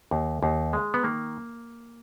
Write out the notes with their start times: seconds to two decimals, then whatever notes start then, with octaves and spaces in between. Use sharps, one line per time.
0.11 D#2
0.43 D#2
0.73 G#3
0.94 B3
1.03 D#3 A#3